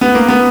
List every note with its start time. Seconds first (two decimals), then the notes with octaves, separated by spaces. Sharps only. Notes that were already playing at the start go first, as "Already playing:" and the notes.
0.01 B3
0.15 A#3
0.28 B3